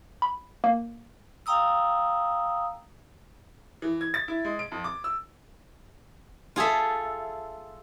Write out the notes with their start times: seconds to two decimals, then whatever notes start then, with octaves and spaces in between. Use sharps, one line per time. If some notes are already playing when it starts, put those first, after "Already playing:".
0.22 B5
0.64 A#3
1.46 F5 G5 A#5 D#6 E6
3.82 E3
4.01 G#6
4.14 A6
4.28 E4
4.45 G#3
4.59 D7
4.72 F2
4.84 D6
5.04 E6
6.56 F4 G#4 A4 E5